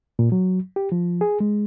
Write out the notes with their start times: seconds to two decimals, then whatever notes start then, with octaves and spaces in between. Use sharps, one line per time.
0.19 A#2
0.32 F#3
0.76 G4
0.92 F3
1.21 G#4
1.40 G#3